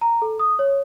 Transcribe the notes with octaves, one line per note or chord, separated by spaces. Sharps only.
A#5
A4
D#6
C#5